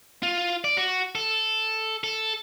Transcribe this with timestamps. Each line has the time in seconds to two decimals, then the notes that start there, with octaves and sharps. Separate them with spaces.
0.23 F4
0.64 D5
0.77 F#4
1.15 A4
2.04 A4